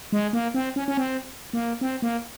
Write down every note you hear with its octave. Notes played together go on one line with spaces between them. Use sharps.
G#3
A#3
C4
C#4
C#4
C4
A#3
C4
A#3